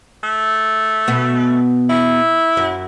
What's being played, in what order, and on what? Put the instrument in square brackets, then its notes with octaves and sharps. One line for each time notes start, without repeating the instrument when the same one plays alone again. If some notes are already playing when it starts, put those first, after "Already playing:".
[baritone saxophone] A3
[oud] B2 B3
[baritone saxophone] E4
[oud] F#2